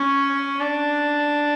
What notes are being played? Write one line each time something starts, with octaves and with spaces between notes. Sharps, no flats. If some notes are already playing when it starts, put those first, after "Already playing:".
Already playing: C#4
D4